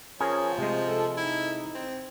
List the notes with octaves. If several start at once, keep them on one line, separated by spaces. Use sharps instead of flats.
F3 C#4 G#4 A#4 C#5
C3 G#3 A3
A4
D#4 E4
C4